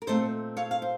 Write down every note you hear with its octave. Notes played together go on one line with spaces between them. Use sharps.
A#4
A#2 A3 C4 D#4 A4 C5
C#5 F5
F5
C5